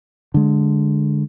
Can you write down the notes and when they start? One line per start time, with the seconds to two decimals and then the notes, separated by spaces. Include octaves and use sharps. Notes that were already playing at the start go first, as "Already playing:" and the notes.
0.34 D3 G#3